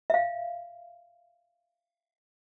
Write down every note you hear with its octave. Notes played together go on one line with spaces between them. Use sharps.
E5 F5